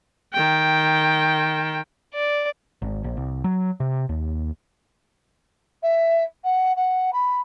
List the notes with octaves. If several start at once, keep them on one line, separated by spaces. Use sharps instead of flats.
D#3 G5
D5
G#1
A#1
C2
F#3
C3
D#2
E5
F#5
F#5
B5